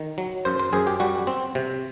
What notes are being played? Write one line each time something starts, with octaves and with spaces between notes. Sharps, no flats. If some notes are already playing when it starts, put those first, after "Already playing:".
Already playing: D#3
F#3
F#2 C5
C5
F#2 G#4
G4
G3 F#4
C4
C3